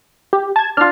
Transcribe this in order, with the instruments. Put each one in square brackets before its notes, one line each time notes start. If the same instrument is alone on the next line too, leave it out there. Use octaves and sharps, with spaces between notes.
[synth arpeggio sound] G4
A5 G#6
[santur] D4 F4 [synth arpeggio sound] F6